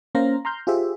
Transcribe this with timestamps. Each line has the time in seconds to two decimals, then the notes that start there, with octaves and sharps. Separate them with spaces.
0.15 A#3 C#4 C5 F5 A#5 A#6
0.45 A#5 C6 F6 G6
0.67 F4 G4 G#4 C5 E5